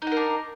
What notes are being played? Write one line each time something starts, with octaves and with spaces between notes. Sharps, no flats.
D4 D#4 A#4 F#5